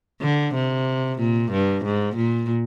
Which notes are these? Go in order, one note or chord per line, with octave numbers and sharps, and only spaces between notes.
D3
C3
A#2
G2
G#2
A#2